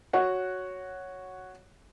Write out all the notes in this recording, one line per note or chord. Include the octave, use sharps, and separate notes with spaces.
F#4 C#5 F#5